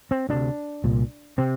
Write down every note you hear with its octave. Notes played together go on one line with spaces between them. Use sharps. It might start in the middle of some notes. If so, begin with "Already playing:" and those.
C4
D2 C3 D4
C2 A#2
C3 C4